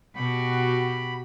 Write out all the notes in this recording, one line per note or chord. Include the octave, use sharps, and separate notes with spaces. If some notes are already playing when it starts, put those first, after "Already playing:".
B2 F#4 G4 B5